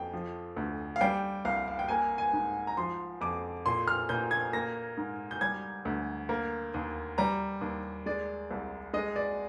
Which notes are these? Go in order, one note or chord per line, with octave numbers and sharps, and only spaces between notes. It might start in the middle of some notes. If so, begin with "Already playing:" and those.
Already playing: F2 G5
F3
D2
F5
G3 G5
C2 F5
F5
G5
A#3 G#5
G#5
G#2
A#5
F3 C6
F2 D6
A#2 C6
F6
A#2 G6
G#6
A#3 A#6
G#2
G6
G3 G#6
D2
A#3
D#2
G3 A#5
D#2
G#3 D5
C2
G#3 D#5
D5